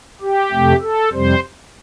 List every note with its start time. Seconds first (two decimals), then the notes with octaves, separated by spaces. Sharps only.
0.21 G4
0.52 F2 C3 A3
0.82 A4
1.12 F2 C3 G3 C5